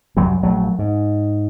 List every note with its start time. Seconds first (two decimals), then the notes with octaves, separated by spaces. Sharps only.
0.17 C2 F#2 F#3 G3
0.43 A#1 F#3 A3
0.79 G#2